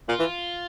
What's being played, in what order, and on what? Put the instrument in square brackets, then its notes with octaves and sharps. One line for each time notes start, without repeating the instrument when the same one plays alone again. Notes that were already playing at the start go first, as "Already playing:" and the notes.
[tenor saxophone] A#2 [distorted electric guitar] F4
[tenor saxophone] E3